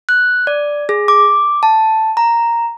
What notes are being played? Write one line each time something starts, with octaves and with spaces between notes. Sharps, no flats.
F#6
D5
G#4
D6
A5
A#5